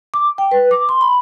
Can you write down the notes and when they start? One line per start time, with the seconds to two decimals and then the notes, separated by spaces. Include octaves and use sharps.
0.14 D6
0.38 G5
0.51 B4
0.71 D6
0.89 C6
1.01 B5